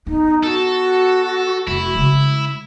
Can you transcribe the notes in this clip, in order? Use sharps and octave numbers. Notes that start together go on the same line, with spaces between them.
B3 D#4
F#4 A4
F1 E4
C#3 G#3